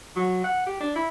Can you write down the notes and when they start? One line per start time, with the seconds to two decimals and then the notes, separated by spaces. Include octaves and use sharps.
0.16 F#3
0.44 F#5
0.67 G4
0.81 D4
0.95 E4